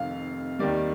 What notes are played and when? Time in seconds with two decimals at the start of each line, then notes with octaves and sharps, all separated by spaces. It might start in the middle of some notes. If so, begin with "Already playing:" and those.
Already playing: F1 F2 D#3 F5
0.59 D#2 D#3 G3 D5